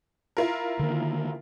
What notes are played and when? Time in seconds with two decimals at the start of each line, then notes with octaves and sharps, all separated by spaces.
0.37 E4 F4 A#4
0.79 D3 D#3 A#3